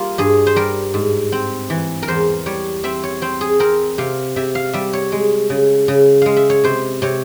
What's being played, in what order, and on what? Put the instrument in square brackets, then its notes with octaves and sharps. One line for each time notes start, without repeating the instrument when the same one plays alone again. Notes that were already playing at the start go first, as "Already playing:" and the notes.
Already playing: [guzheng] G3 A#3 F4
G2 G#4
C5
G3 A#4
G#2
C4
E3
A#4
E2 C5
G3 C#5
C4 E5
C#5
C4 C5
G#4
C4 A#4
C3 F5
C3 E5
F5
G3 E5
C#5
G#3
C#3
C#3
G#3 F5
E5
C#5
C3 C5
C3 C#5